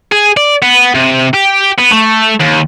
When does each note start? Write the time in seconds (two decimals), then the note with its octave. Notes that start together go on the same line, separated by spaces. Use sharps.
0.12 G#4
0.37 D5
0.62 B3
0.95 C3
1.34 G4
1.78 B3
1.91 A3
2.40 D#2